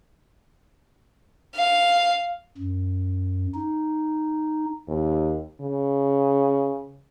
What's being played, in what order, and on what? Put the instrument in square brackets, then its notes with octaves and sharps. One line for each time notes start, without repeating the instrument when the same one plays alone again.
[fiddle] F5
[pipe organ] F#2
D#4
[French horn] D#2
C#3